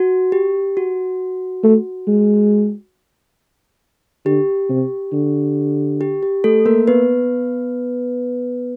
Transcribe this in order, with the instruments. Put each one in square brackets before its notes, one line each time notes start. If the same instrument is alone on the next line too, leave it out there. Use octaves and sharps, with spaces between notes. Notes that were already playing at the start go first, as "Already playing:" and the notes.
Already playing: [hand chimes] F#4
G4
F#4
[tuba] A3
G#3
[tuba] D3 [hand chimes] G4
[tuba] C3
D3
[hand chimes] G4
G4
A3 A4
A#3 A#4
B3 B4